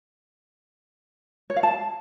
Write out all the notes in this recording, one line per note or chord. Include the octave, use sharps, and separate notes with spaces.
C#5
F5
A5